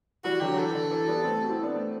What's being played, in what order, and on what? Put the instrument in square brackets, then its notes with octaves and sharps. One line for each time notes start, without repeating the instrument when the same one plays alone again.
[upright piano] E3 G3 [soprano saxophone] F#4
[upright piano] D3 F#3 [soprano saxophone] G4
[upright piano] F#3
[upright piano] E3 [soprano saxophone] A4
[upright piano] E3
D3
E3
G3 B3
A3 C4
F#4
C4 E4
B3 D4
A3 C4